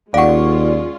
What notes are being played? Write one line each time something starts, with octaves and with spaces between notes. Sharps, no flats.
D#2 G#3 C#4 F4 D5 F5 F#5 C#6